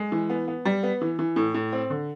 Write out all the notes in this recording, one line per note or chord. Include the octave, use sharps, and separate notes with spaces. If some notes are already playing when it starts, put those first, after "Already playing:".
Already playing: G#3
E3
B3
B3
G3
B3
E3
E3
A2
A2
C4
D3